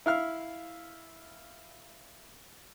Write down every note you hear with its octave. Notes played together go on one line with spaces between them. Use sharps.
E4 F5 F6